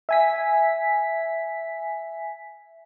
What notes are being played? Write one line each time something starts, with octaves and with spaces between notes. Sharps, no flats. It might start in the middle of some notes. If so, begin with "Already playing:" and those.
E5 G#5 B6